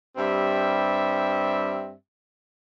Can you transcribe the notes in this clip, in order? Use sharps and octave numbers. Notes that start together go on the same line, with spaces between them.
G2 G3 C4 E5